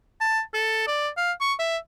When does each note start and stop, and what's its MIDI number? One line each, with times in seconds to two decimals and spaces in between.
0.21 0.41 81
0.54 0.84 69
0.87 1.09 74
1.17 1.32 77
1.41 1.54 85
1.59 1.77 76